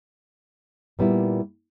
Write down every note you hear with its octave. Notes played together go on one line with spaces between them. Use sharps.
A#2 G3 B3 E4